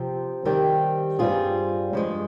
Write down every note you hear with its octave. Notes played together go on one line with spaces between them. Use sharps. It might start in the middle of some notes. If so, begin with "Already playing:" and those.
Already playing: C3 F3 C4
D#3 G3 C4 G4
G2 G3 C4 F4 G#4
G2 F3 G#3